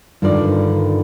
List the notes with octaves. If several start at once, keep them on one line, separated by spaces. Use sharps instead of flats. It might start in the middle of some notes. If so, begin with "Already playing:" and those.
G2 D3 D#3 F4 D5